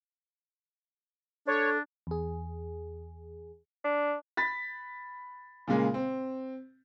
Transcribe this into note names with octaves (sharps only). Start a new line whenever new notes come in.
D4 A4 C#5
E2 G#4
D4
B5 A6 B6
A#2 C#3 G#3 A#3
C4